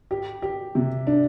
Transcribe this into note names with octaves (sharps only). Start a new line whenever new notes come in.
G4
G4
C3
D4